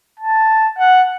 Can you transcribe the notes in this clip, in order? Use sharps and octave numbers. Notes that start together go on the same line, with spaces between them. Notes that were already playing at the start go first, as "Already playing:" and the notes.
A5
F#5